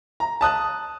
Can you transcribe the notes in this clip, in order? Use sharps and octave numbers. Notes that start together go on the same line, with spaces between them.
A#5
A5 D#6 F#6